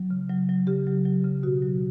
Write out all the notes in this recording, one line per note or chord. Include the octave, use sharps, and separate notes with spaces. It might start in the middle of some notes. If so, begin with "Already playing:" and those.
Already playing: F#3
C#3
F#3
F#3
C#3 G4
F#3
F#3
C#3
B2 F#4
F#3